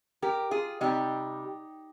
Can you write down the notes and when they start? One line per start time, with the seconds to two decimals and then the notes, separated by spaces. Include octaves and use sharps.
0.22 G4 A#4
0.51 F4 G#4
0.81 C3 G3 D#4 G4